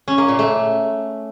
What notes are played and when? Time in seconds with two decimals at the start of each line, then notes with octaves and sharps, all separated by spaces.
0.08 C#4
0.18 A#3
0.28 A#2
0.39 A3